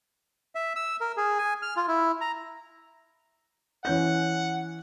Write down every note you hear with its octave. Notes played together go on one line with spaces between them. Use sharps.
E5
E6
A#4
G#4
G#5
F6
F4
E4
A#5
E3 C#4 F#5 G6